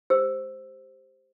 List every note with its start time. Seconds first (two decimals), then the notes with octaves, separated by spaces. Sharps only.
0.10 G4 C5 E6